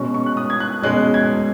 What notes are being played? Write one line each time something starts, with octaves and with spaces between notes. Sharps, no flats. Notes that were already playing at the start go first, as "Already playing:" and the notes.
Already playing: B2 G#3 C#4 C#6
C#6
F#6
D#6
G#6
F#6
B2 G#3 C#4 F#6
G#6